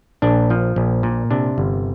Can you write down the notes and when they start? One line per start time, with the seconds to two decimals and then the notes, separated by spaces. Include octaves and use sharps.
0.22 A#1 D4
0.50 F3
0.76 A#1
1.03 A#2
1.31 C3 D4
1.58 G1